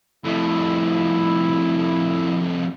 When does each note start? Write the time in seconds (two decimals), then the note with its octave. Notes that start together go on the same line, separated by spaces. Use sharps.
0.25 F2 A2 E4